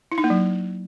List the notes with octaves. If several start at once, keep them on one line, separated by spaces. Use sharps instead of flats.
E4
D#4
A#3
F#3